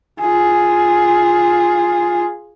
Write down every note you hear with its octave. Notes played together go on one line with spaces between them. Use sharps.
F4 G#4